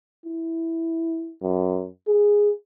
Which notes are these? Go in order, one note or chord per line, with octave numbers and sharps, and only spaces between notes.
E4
F#2
G#4